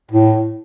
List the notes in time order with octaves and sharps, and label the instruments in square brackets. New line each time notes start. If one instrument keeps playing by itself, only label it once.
[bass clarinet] A2